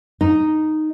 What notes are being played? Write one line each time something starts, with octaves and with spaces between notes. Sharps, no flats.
D#4